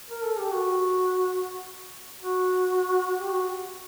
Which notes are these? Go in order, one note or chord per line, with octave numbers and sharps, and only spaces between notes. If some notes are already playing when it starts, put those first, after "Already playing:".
A#4
A4
G4
F#4
F#4
G4
F#4